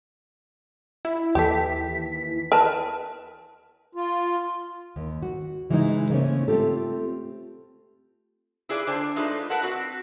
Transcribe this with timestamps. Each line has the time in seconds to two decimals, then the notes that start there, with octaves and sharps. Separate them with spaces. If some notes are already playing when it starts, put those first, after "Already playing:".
1.05 E4
1.35 D#2 E3 G4 A4 B6
2.52 A#4 B4 A5
3.95 F4
4.96 D#2
5.23 F#4
5.70 C#3 E3 G#3 B3 C#4 D#4
6.10 C#3 A3 A#3 C4 C#4 C#5
6.48 A3 C4 F4 G4 A4
8.69 E4 F4 G#4 B4 D5
8.87 D3 D4 C5 G#5
9.16 G#3 A3 D#4 F4 B4
9.50 A#4 B4 F#5 A5
9.62 C4 F#4 B4